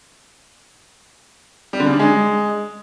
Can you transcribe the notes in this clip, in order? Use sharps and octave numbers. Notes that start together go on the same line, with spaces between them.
G3
D3
C#3
D4
G#3